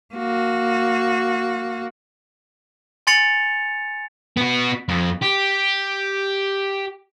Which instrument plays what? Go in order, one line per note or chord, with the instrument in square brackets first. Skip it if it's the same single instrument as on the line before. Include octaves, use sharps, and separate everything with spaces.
[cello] A#3 F#4
[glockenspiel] G#5 C6 A6 C#7 F7
[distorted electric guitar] B3 F#4
F2
G4